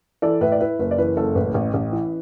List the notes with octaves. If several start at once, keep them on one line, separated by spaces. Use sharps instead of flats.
E3 A4 D5
A2 B4 E5
D5
E4 B4
F#1 B4
D5
E3 B4
F#1 A4
A1 B4
A1
A1
E3